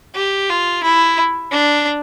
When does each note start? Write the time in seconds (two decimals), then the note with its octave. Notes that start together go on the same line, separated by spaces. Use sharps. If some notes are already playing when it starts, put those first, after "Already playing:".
0.15 G4
0.50 F4
0.84 E4
1.52 D4